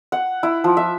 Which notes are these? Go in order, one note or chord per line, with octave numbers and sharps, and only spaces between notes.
F#5
E4
F3
E5